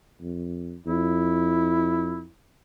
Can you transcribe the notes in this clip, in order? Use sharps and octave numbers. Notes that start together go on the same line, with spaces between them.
F2
F2 E4